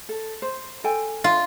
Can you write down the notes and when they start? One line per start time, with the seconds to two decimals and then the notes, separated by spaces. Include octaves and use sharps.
0.09 A4
0.42 C5
0.84 A4 G5 G#5
1.24 F4